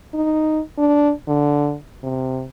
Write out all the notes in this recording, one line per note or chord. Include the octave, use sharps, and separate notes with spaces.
D#4
D4
D3
C3